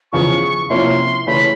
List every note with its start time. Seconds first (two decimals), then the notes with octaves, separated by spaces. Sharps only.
0.12 E2 C#3 F3 C#6
0.69 C3 F3 A#3 C#4 E4 C6
1.26 C#3 E3 A3 C#4 B5